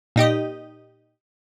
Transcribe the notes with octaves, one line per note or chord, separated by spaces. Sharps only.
A#2 D#4 G4 D#5